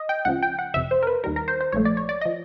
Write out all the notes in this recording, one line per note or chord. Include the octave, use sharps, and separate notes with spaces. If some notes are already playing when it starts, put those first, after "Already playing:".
Already playing: D#5
G5
C#2 C#3 F3 F#5
G5
F#5
G1 F2 C3 E5
C5
A#4
B4
D#2 D#3 G3 A#4
A#4
C5
C5
A#1 G#2 F3 A3 C#5
D5
C#5
D5
D#5
F3